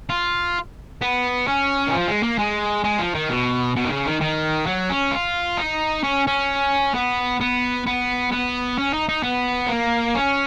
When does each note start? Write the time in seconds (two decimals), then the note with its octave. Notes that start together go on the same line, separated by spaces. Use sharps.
0.10 F4
1.02 B3
1.47 C#4
1.87 D#3
1.93 F3
2.08 G#3
2.23 A#3
2.39 G#3
2.84 G#3
2.99 F3
3.15 D#3
3.30 B2
3.76 B2
3.85 D#3
3.90 C#3
4.06 D#3
4.21 D#3
4.66 F#3
4.90 C#4
5.12 F4
5.58 D#4
6.03 C#4
6.27 C#4
6.95 B3
7.41 B3
7.86 B3
8.32 B3
8.78 C#4
8.93 D#4
9.09 D#4
9.23 B3
9.69 A#3
10.15 C#4